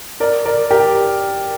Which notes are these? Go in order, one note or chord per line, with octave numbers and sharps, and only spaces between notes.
A#4 D5
A#4 D5
G4 A#4